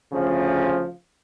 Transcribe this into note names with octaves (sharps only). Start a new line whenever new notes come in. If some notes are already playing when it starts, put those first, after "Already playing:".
D2 C#3 F3